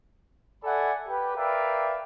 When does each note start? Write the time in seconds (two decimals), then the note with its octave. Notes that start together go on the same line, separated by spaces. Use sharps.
0.64 A4 D5 E5 F#5 G#5 B5
1.07 G4 B4
1.36 A#4 B4 D5 E5 F5 G5